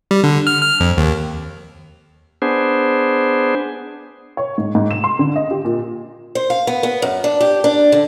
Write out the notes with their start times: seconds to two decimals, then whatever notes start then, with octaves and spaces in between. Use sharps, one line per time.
0.11 G3
0.24 D3
0.47 F6
0.61 F6
0.80 F2
0.97 D#2
2.42 B3 D4 G#4 C5
4.37 C#5
4.58 G#2
4.75 G#2
4.91 E7
5.04 C6
5.19 D3
5.36 D#5
5.51 G4
5.65 A#2
6.35 C5
6.50 F5
6.67 B3
6.83 B3
7.02 F#2
7.24 D4
7.41 G4
7.64 D4
7.92 D3